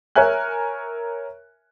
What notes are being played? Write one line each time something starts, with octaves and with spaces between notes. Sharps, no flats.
A#4 C#5 E5 G#5 F#6